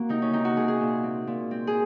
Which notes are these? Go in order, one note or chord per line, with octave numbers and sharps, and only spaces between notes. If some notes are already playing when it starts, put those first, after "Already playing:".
Already playing: A#3 F#4
C3 D#4
C#4
C3 D#4
F#4
C3 G#4
G#4
A#2
C4
A#2
C4
G#4